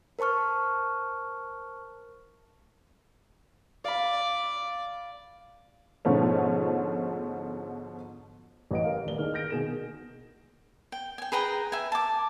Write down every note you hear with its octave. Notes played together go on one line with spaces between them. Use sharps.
A#4 C5 A5 C#6 F6
D5 F5 B5
G#2 B2 D3 F3 A3 C#4
A1 E3 B4 D#5 F#5 D7
A#4 F5
D#1 A3 D5 G7
D#3 B3 G#4 A#4 F6
F6 G6 A#6 D7
B2 D#3 G#4 A#4 E7
G5
G5 G#5
G#4 B4 G5 A#5
E5 G5 G#5
A5 D6